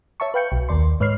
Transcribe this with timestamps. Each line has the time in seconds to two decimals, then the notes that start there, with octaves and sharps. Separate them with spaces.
0.20 C#5 E5 A5 C#6
0.34 B4 F5 G5 G6 C#7
0.52 B1
0.69 D#2 D5 C6
1.00 G#2 B4 C#5 F6 C7